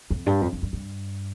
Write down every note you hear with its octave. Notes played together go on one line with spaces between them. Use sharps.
F2
G2
F2
F2
G2
G2